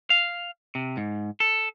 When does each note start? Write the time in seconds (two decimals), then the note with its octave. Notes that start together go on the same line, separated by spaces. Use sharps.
0.10 F5
0.75 C3
0.97 G#2
1.40 A4